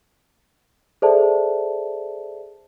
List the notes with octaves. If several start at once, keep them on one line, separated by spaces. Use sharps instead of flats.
G#4 A4 C5 D5 E5 A5